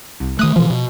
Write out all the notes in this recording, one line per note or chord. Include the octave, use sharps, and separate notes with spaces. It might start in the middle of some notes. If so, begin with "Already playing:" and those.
C2
D#3 A3 D#6 F#6
B2 E3 F3
B2